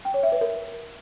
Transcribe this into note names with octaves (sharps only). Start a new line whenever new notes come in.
G5
C#5
E5
B4
A#4